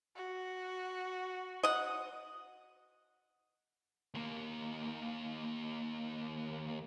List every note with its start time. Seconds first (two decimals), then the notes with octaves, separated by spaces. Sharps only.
0.16 F#4
1.63 D#5 F#5
4.14 D#2 A#3